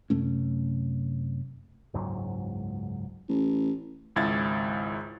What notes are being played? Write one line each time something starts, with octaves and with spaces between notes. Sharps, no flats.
F#2 C3 A3 C#4
F#1 C#2 G#2 F#3
A1
G#1 C#2 E4 G#6 A6